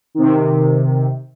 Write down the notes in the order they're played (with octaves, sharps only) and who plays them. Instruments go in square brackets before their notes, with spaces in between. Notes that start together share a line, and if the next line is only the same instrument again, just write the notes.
[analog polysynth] C3 D#3